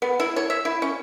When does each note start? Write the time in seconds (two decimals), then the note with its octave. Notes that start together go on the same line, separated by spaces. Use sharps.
0.02 B3
0.20 E4
0.36 C#5
0.50 E5
0.65 E4
0.82 C#4